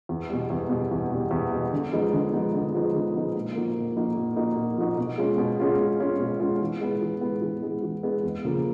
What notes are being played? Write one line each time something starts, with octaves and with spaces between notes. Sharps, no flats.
E2
B2 G3
E2
B2 G3
E2
B2 G3
E2
B2 G3
D3
F3 G#3 B3 D#4
D3
F3 G#3 B3 D#4
D3
F3 G#3 B3 D#4
D3
F3 G#3 B3 D#4
A#2
F3 A#3 D#4 F#4
A#2
F3 A#3 D#4 F#4
A#2
F3 A#3 D#4 F#4
A#2
F3 A#3 D#4 F#4
B2
G#3 C#4 F4
B2
G#3 C#4 F4
B2
G#3 C#4 F4
B2
G#3 C#4 F4
E3
G#3 B3
E3
G#3 B3
E3
G#3 B3
E3
G#3 B3
E2
C#3 F3 A#3